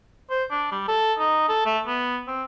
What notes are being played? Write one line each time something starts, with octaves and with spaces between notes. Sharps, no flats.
C5
D4
G3
A4
D#4
A4
A3
B3
C4